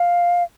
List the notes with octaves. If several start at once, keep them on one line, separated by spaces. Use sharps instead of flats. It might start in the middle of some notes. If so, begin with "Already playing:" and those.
Already playing: F5